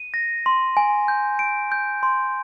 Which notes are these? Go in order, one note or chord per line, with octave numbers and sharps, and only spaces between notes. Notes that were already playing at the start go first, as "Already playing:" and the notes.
Already playing: D#7
A#6
C6
G#5
G6
D7
G6
C6